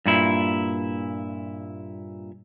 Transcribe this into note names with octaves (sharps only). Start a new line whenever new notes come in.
G2 A#2 E4